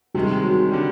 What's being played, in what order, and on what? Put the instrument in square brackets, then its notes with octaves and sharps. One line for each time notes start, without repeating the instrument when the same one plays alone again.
[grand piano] C3 D#3 G#3 [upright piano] G3
[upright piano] F#3
[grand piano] D3 G3